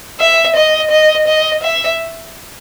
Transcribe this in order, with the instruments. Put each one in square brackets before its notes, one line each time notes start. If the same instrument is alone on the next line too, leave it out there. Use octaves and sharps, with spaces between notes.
[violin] E5
D#5
D#5
D#5
E5